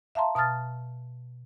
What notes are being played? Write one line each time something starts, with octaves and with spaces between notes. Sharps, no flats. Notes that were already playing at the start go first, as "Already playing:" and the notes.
E5 F5 A5 A#5 C6
B2 A5 D#6 F6 A6